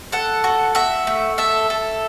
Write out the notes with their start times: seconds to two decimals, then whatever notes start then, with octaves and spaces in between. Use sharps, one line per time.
0.12 A4 F#5
0.44 F#4
0.75 F#4 E5
1.07 A3
1.38 A4 E5
1.70 A4